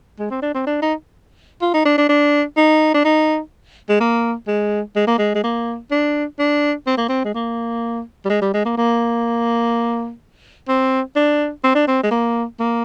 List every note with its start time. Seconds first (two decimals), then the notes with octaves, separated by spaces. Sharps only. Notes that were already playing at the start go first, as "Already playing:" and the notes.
0.19 G#3
0.30 C4
0.42 D4
0.54 C4
0.67 D4
0.82 D#4
1.62 F4
1.74 D#4
1.85 D4
1.98 D4
2.09 D4
2.57 D#4
2.94 D4
3.05 D#4
3.89 G#3
4.00 A#3
4.47 G#3
4.96 G#3
5.07 A#3
5.18 G#3
5.35 G#3
5.43 A#3
5.91 D4
6.39 D4
6.87 C4
6.97 A#3
7.09 C4
7.24 G#3
7.34 A#3
8.25 G3
8.29 G#3
8.41 G3
8.53 G#3
8.65 A#3
8.77 A#3
10.68 C4
11.16 D4
11.64 C4
11.75 D4
11.87 C4
12.03 G#3
12.11 A#3
12.59 A#3